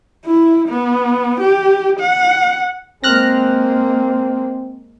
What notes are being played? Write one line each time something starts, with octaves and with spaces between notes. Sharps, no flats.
E4
B3
G4
F#5
G#3 A#3 C4 F6 F#6 A#6